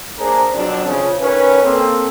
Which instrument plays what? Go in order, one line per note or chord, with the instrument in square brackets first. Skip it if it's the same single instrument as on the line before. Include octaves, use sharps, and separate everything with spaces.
[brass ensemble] A#3 D4 G#4 A#4 C5 A#5
F2 B2 F#3 C4 D4
C#3 F3
D#3 C#4 B4
A#3 C4 A4